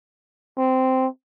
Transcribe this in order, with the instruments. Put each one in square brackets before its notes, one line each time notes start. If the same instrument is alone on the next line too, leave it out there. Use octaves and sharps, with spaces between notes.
[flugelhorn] C4